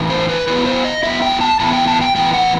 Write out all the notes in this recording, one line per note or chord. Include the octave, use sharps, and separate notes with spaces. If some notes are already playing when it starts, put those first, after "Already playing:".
Already playing: A2 E3 D#4
C5
B4
F#3 B3 E4 B4
C5
D#5
F#3 B3 E4 E5
G5
A5
A2 E3 B3 E4 A5
G5
A5
G5
A2 E3 B3 E4 G5
F#5